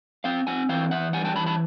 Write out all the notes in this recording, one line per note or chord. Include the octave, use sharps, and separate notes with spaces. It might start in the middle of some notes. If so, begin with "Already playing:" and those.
C4 F5 G5
C4 F#5 G#5
E3 F5 G5
E3 E5 F#5
G3 F#5 G#5
G5 A5
E3 A5 B5
A5 B5